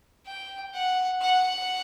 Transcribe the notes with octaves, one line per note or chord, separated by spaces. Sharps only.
G5
F#5
F#5